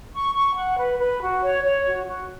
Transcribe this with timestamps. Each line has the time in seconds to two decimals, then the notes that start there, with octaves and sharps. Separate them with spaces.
0.12 C#6
0.34 C#6
0.56 F#5
0.78 B4
0.98 B4
1.20 F#4
1.42 C#5
1.63 C#5
1.85 F#4
2.06 F#4